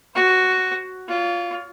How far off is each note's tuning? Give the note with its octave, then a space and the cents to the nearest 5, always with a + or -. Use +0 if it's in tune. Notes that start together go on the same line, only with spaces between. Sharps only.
F#4 +5 C5 +15
F4 +0 C#5 +40